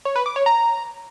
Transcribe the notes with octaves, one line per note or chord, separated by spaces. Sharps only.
C#5
B4
D6
C#5
A#5